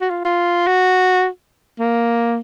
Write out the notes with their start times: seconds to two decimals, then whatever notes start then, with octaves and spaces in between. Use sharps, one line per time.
0.01 F#4
0.10 F4
0.25 F4
0.67 F#4
1.80 A#3